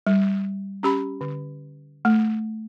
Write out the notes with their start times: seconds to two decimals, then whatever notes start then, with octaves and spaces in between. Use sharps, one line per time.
0.07 G3
0.83 C#4 G4 B5
1.21 D3
2.05 A3